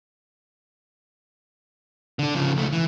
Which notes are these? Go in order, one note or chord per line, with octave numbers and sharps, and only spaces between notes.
D3 D4
C#3 F3
C#2 A3
E3